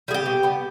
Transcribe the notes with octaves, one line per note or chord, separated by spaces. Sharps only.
G3 B3 G#4
G4
B2
G3 B3